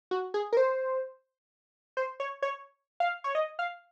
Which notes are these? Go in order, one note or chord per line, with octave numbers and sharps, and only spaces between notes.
F#4
G#4
A#4
C5
C5
C#5
C#5
F5
C#5
D#5
F5